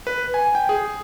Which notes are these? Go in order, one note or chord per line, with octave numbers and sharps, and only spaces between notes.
B4
G#5
G5
G#4